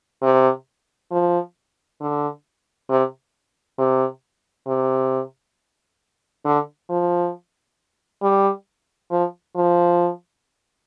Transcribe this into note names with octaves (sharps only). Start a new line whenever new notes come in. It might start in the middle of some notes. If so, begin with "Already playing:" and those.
C3
F3
D3
C3
C3
C3
D3
F3
G3
F3
F3